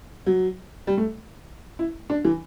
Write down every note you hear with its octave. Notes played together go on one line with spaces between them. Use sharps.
F#3
G3
A3
E4
D4
E3